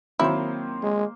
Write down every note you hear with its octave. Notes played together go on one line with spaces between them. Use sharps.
D#3 F#3 A#3 C4 E4 C5
G#3